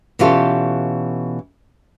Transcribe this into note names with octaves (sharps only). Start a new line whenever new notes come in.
B2 E3 C#4 F4 G4 A4